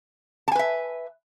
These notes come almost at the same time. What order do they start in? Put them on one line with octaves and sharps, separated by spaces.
A5 G#5 B4 E5